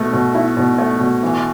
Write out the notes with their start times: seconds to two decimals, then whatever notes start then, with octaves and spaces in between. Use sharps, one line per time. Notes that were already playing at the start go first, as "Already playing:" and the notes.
Already playing: B2 A3
0.13 B2
0.35 E4
0.57 B2
0.79 A3
1.00 B2
1.23 E3